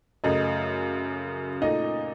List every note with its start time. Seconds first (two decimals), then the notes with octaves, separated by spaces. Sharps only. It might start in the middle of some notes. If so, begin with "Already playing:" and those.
0.24 F#2 C#3 A3 D#5
1.61 A#2 A3 D#4 D#5